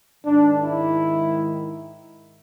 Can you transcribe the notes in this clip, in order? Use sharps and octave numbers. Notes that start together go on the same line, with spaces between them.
G#2 D#3 G#3 D4
E4